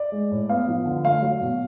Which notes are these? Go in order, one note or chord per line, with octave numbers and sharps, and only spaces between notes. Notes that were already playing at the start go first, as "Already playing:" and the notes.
Already playing: D5
G#3
A2
B3 F5
F3
D3
A3 F5
F#3
B2